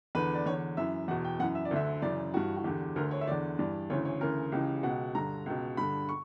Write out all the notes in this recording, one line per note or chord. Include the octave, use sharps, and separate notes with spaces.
E2 D3 B4
D5
E2 D3 C#5
F#2 E3 E5
E2 B2 F#5
G5
F#2 E3 F#5
E5
D5
D2 D3 E5
F#2 C#3 E3 D5
G2 E3 F#4
F#4
E2 D3 G4
D2 D3 A#4
C#5
E5
E2 D3 D5
G2 E3 D5
D2 C#3 E3 C#5
C#5
D2 C#3 E3 A#4
C#2 C#3 E3 G4
C#2 B2 F#5
G2 D3 A#5
C#2 B2
G2 D3 B5
C#6